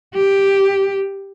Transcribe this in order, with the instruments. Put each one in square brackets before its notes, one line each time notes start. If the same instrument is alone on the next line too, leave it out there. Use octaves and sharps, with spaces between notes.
[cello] G4